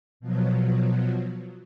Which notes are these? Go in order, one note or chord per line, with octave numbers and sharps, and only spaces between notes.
B2 F3 F#3